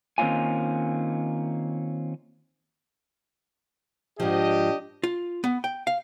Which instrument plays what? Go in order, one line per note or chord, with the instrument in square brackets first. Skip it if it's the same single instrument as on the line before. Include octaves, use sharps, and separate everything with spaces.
[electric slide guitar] D#3 A#3 C4 C#4 F4 G#5
[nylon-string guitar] G#2 F3 [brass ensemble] D4 G4 D#5
[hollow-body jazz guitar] F4
B3
G5
F5